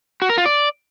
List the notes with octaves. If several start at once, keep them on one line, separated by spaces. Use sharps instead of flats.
F#4
A#4
F4
D5